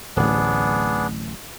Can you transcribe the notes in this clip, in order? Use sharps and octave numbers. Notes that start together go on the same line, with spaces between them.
D1 A1 B3 D4 G#4